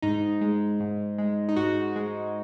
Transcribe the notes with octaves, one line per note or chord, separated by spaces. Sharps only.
G#2 D#4
G#3
G#2
G#3
D#4
G#2 F#4
G#3